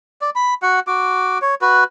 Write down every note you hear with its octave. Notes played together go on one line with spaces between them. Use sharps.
D5
B5
F#4 F#5
F#4 D6
C#5
F#4 B4